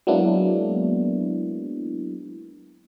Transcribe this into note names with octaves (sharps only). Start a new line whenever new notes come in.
F#3 G#3 A#3 B3 D4 E4